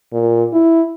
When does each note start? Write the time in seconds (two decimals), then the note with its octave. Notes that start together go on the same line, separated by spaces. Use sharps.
0.13 A#2
0.53 E4